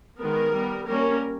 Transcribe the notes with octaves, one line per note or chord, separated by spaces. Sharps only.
D#3 G#3 B3 A#4
G3 B3
G3 A#3 C#4 A#4